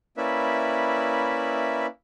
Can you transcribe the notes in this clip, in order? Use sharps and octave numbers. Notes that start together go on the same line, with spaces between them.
A#3 C#4 E4 B4 D5 E5